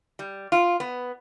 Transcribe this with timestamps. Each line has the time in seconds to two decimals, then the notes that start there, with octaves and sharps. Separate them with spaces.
0.19 G3
0.52 F4
0.80 B3